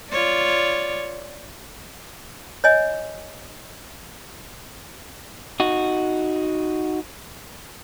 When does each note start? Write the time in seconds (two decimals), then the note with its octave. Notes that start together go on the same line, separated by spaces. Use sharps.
0.10 F4 C#5 D5
2.64 C#5 D#5 G#5
5.60 D#4 F#4